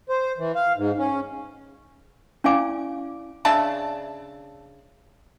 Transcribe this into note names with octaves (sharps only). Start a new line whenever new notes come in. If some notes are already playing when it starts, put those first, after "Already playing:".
C5
E3
F5
G#2
C#4
C#4 E4 D5 F5 G#5 D6
C#3 D4 E5 A5